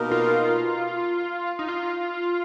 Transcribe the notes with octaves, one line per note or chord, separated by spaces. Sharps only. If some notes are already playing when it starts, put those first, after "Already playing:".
Already playing: B2 A#3 D#4 A#4
F4
D#4
F4